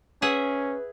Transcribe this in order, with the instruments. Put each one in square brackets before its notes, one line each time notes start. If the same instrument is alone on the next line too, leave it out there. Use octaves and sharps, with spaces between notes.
[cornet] C#4 [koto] G#4 E5 F#5 [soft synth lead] B4